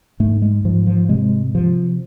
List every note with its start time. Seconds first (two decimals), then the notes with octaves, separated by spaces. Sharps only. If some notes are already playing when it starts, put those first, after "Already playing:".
0.20 G#2 A3
0.42 G#3
0.65 G#2 F3
0.87 F3
1.09 C3 G#3
1.54 C3 F3